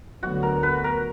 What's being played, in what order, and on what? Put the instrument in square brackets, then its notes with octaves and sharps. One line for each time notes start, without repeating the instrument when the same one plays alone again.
[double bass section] D2 D3 F#3 B3 [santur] F#4
[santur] A#4
B4
A#4